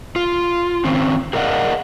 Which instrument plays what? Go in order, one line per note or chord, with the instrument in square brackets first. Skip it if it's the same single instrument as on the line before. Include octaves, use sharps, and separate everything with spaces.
[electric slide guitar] F4
D#3 C4 C#4
G#4 A#4 D5 D#5 F5 F#5